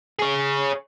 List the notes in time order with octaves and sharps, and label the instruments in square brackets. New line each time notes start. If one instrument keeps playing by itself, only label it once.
[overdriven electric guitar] G#4 C#5